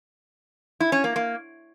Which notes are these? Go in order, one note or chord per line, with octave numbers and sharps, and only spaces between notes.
E4
C#4
A#3
A#3